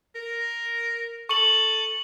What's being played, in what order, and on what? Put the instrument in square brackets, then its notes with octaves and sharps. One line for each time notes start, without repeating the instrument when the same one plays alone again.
[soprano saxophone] A#4
[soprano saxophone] A4 [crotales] C#6 F#7